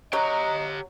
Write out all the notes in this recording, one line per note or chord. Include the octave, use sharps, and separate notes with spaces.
F#3 G4 D#5 A#5